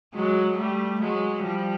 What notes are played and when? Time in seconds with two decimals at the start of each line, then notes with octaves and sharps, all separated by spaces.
0.15 F#3 G#3
0.58 G3 A3
1.00 F#3 G#3
1.44 F3 G3